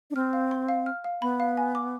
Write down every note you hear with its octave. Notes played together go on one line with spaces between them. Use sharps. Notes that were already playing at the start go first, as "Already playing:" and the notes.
D4
C4 F6
F5
C6
F5
F6
F5
B3 B5
F5
G#5
D6